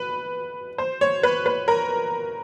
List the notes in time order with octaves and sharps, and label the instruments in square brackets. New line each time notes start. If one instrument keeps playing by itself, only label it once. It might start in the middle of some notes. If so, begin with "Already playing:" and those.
Already playing: [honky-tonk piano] B4
C5
C#5
B4
B4
A#4